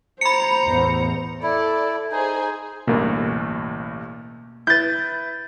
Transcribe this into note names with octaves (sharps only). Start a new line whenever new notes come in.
C5 A#5 B5 C#7
A1 E2
E4 A4 D5
D#4 G#4 C5 G#5
A1 D2 G2 B2 A#3
E4 B4 G6 A6